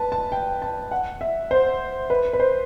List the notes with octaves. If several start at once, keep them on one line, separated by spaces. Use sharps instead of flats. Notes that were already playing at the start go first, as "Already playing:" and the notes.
Already playing: B4 A5
A5
G5
A5
F#5
E5
C5
B4
B4
C5